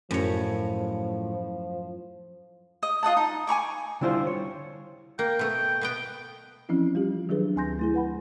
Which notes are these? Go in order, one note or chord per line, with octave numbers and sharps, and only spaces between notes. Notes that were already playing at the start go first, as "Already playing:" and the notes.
F#2 A2 F3 C#5
D#5
F4 D#5 F#5 A5
D#4
G#5 A#5 C#6 D6
D3 G3 E4 F4 B4 C5
C#5
A#3 G5
B2 A3
B2 B3 G5
E3 F3 C4 C#4 E4
G3 F4 G4
D#3 F#3 D4 G#4 B4
D2 C4 G#5 C6 G6 A#6
A3 E4 G#4
B4 F#5 B5